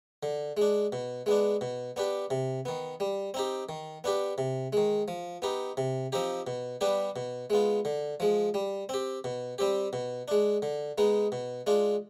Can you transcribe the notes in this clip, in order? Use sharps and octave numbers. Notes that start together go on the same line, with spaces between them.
D3
G#3 D4
B2
G#3 B3 D4
B2
B3 D4 G4
C3
D#3 B3
G3
C4 D#4 G4
D#3
B3 D4 G4
C3
D#3 G#3
F3
B3 D#4 G4
C3
F3 C4 D#4 G4
B2
G3 B3 D4 G4
B2
G#3 B3 F4
D3
F3 G#3
G3
C4 G4
B2
G3 C4 G4
B2
G#3 D4
D3
G#3 B3 D#4
B2
G#3 D4 F4